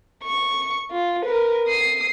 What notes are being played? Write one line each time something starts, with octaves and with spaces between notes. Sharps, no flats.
C#6
F4
A#4 B4
D#6 C7